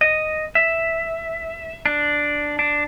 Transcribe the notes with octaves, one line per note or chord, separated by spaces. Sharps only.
D#5
E5
D4
D4